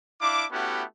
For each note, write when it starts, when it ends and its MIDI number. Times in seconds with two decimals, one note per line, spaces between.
0.21 0.45 62
0.21 0.45 64
0.21 0.45 77
0.21 0.45 86
0.52 0.83 57
0.52 0.83 59
0.52 0.83 61
0.52 0.83 64
0.52 0.83 66
0.52 0.83 67